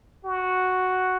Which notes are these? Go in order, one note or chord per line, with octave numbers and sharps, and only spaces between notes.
F#4